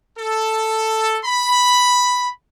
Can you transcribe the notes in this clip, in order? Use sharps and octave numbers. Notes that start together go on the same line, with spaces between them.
A4
B5